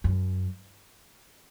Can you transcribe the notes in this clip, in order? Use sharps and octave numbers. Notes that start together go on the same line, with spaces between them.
F#2